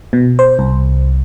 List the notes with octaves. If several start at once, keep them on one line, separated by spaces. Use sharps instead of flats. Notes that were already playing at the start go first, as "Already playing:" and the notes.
B2
C5
C2